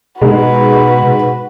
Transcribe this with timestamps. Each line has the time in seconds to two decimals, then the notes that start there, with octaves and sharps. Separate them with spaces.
0.21 G#2 B2 G#3 F#4 B4